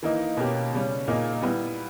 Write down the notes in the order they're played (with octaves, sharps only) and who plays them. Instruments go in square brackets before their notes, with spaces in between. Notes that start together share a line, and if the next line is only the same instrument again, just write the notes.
[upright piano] E3 A#3 D#4
B2 A#3 C#4 G4
C#3 G3 C#4
A#2 A#3 D#4 G#4
G3 B3 E4